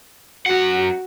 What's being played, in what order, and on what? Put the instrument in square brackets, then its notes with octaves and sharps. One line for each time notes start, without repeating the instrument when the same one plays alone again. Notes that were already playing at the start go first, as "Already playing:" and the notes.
[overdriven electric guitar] F#2 F#5 [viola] F#4